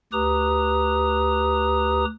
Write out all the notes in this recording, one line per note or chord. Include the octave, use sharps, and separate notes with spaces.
D2 G4 B4 A#5 D#6